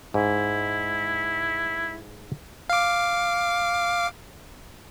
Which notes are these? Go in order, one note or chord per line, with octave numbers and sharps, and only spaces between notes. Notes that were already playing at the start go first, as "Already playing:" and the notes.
G#2 E4
F5 D6